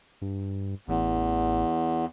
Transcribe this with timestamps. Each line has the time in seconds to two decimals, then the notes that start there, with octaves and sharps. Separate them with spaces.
0.22 G2
0.88 A1 E2